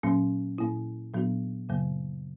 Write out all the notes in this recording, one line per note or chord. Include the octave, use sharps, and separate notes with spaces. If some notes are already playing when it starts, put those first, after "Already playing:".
A#2 F#3 A#3 C#4
A#2 A#3 E4
A#2 F#3 B3 D4 F#4
F#2 C#3 F#3 A#3